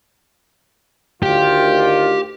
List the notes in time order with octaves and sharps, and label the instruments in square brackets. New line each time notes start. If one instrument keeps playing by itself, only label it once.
[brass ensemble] D2 D#3 F4 [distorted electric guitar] G4